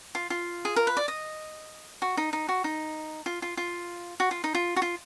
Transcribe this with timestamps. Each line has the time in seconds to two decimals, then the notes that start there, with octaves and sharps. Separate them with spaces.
0.15 F4
0.30 F4
0.65 G#4
0.76 A#4
0.87 B4
0.97 D5
1.08 D#5
2.02 F#4
2.17 D#4
2.33 D#4
2.48 F#4
2.64 D#4
3.26 F4
3.42 F4
3.57 F4
4.20 F#4
4.31 F4
4.44 D#4
4.55 F4
4.76 F#4
4.82 F4